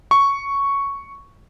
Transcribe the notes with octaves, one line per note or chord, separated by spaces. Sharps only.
C#6